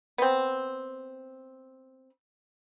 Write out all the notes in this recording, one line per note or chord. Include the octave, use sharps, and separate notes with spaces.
B3 C4